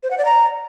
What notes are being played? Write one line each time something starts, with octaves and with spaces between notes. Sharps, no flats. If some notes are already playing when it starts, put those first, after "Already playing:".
C5
F#5
D5
A#5